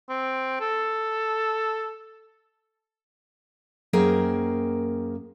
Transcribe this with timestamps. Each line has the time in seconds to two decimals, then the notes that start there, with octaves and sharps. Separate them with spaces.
0.09 C4
0.60 A4
3.93 F#2 A#3 G#4 A#4 C5 G5